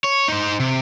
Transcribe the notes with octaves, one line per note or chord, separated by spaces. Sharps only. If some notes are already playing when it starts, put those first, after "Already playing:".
C#5
D#4 C5
C3